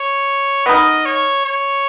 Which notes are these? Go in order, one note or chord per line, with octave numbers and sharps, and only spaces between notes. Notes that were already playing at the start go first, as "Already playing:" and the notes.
Already playing: C#5
B3 D#4 A#4 D#5
C#5
C#5